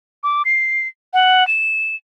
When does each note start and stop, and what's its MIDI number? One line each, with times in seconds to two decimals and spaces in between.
0.23 0.43 86
0.45 0.88 96
1.13 1.47 78
1.47 1.95 100